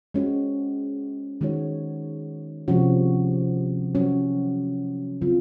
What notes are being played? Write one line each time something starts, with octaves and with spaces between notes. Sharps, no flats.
G#3 C#4 F#4
D#3 G#3 D#4 F#4 C#5
C3 F3 G#3 C#4 F#4
F#3 C#4 F#4
C#3 F#3 C4 F4